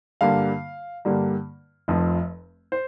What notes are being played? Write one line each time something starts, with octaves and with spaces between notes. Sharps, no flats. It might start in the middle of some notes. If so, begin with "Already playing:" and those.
G2 D3 G3 A#3 F5
G2 D3 G3 A#3
F1 F2 F3
C5